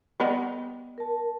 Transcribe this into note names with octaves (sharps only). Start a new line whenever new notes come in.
G3 B3 D#5
A#4 A5